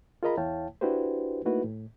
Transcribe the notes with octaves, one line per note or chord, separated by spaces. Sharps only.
F4 G#4 A#4 D#5 A#5 B5
E2 E4 C#5 F5 G5 A5
D4 E4 F#4 G4 B4 C5
A3 A#3 D#4 E4 F#4 B4
A2